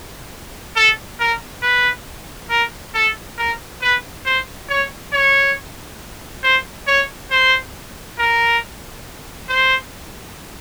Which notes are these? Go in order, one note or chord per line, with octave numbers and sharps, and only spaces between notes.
A4
A#4
B4
A#4
A4
A#4
B4
C5
C#5
C#5
C5
C#5
C5
A#4
C5